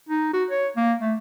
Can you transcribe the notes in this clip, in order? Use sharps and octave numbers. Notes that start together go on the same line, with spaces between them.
D#4
F#4
C#5
A#3
A3